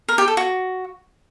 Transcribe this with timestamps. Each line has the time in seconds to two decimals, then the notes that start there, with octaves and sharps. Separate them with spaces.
0.09 A#4
0.18 G4
0.28 A4
0.37 F#4